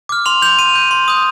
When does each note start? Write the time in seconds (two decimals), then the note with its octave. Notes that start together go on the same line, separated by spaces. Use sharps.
0.09 D6 F6
0.26 C6 F7
0.42 G6 F7
0.59 C6 D#7
0.75 G6
0.91 C6
1.08 D#6 G6